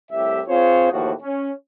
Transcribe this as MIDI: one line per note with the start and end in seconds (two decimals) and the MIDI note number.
0.11 0.40 36
0.11 0.40 45
0.11 0.40 67
0.11 0.40 76
0.47 0.87 60
0.47 0.87 65
0.47 0.87 68
0.47 0.87 72
0.47 0.87 73
0.91 1.12 39
0.91 1.12 45
0.91 1.12 52
0.91 1.12 53
0.91 1.12 66
1.22 1.51 61